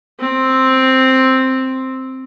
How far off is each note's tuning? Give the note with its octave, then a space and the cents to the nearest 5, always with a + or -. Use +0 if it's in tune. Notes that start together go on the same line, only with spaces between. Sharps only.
C4 +0